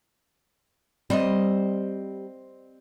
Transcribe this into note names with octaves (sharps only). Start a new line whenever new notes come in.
G3 C4 C5 D#5